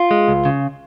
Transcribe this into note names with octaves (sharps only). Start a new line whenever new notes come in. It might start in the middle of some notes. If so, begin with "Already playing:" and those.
Already playing: F4
G#3
C#2
C#3